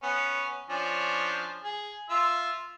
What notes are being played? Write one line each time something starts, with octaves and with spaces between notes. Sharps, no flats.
B3 C#4
F3 C#4 D4
G#4
F4 E5 E6